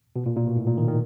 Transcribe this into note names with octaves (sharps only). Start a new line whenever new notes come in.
B2
A#2
A#2
B2
A2
A#2
D#3
D#3